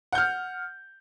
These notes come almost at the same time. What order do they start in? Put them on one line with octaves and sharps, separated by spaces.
F#5 G6 F6